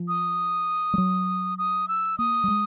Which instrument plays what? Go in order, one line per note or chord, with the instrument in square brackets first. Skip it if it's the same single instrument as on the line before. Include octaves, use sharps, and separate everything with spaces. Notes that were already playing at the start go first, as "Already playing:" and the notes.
Already playing: [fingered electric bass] F3
[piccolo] D#6
[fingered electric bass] G3
F#3
[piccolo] D#6
E6
[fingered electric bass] A#3 [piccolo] D#6
[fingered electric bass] G3
G#3